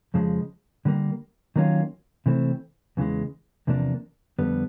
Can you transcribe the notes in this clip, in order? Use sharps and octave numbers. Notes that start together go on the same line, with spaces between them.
F2 C#3 F3 G#3
D3 G3 A#3
D#3 F#3 A#3 C#4 F4
C3 E3 A3 C4
E2 C#3 E3 G#3
E2 C3 F3 A#3 D4
F2 D3 G3 B3